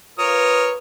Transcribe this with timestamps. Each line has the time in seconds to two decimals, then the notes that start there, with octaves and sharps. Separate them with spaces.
0.19 F4 A#4 B4 C#5 D#6